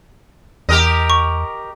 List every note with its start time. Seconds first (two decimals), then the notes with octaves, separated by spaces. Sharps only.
0.69 E2 G4 A#4 D#5
1.10 C#6